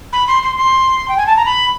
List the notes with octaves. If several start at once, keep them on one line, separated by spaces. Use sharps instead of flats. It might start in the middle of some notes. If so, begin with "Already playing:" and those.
B5
C6
C6
C6
G5
G#5
A5
A#5
B5